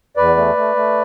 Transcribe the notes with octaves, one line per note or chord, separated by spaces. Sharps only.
E2 B4 D5
A3
A3
A3